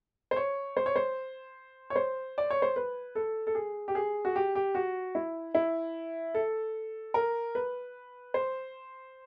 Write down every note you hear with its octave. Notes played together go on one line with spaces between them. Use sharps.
C5
C#5
C5
C#5
C5
C#5
C5
D5
C#5
C5
B4
A4
A4
G#4
G4
G#4
F#4
G4
G4
F#4
E4
E4
A4
A#4
B4
C5